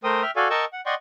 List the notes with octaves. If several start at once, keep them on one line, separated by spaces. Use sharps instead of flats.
A3 A#4 C5 G5 D#6
E5 G5 F6
F#4 A4 D5 F5 G#5
A#4 D#5 G5 A5 C#6 E6
F#5
D5 D#5 F#5 G5 C6 C#6